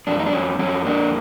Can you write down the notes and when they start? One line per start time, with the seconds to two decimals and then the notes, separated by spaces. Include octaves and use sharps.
0.07 F2 D4
0.19 D#4
0.26 D4
0.33 F2 C#4
0.59 F2 C#4
0.85 A#3 D4